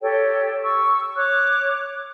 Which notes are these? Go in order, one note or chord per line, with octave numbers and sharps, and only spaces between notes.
G4 A4 C#5 G5
C#6 E6
C#5 D6 F#6